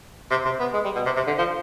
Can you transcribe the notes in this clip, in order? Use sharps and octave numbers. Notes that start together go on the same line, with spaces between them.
C3
C3
B3
G#3
G3
B2
C3
C3
D3
F3